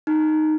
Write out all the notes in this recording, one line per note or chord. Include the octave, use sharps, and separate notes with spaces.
D#4